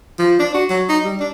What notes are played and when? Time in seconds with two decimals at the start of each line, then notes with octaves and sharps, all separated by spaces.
0.19 F3
0.39 D4
0.54 F#4
0.69 F#3
0.89 D#4
1.04 G3
1.20 D4